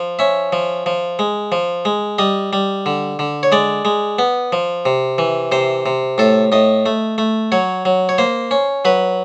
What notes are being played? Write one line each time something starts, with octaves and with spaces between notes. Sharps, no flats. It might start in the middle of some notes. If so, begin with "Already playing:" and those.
Already playing: F3
C#4 E5
F3
F3
G#3
F3
G#3
G3 D#5
G3
D3
D3
C#5
G#3 D5
G#3
B3
F3
C3
E3
C3 C5
C3
A2 A4
A2 D#5
A3
A3
F#3 C#5
F#3
C#5
A#3 C5
C#4
F#3 B4